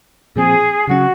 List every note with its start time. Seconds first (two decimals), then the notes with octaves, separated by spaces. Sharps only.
0.36 A#2 F3 C4 G#4
0.87 C#3 F#3 C#4 F#4